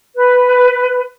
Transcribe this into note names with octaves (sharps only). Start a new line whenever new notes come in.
B4